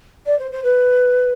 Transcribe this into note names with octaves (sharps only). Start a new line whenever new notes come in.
D5
C5
C5
B4